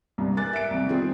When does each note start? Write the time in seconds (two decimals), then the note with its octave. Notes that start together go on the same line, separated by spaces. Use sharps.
0.18 C2 G2
0.37 A#4 G#5 D6 F#6 A6
0.53 E5 D7
0.71 C2 F2
0.87 D#3 G3 B3 C4 F4 G#4